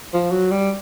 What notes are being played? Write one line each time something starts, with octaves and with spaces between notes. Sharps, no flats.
F3
F#3
G3